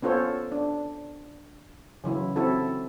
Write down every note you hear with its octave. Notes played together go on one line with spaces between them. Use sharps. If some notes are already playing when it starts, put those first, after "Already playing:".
B3 C#4 F4 A4 C5 C#5
D4
C#3 E3 F#3 E4
C4 E4 F#4 A4